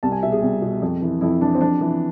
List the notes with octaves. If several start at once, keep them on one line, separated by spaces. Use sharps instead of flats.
C2 A5
G#5
B2 E5
G#4
C2
B2
F2
E3
F2 E4
E3 D4
C4
F2 D4
E3